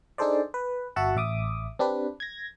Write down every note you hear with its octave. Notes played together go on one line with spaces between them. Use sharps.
D4 D#4 G#4 A4 C5 D5
B4
G1 F#4 E5 F#5 A5
A1 E5 D6 D#6
C4 D4 G4 B4
G#6 A#6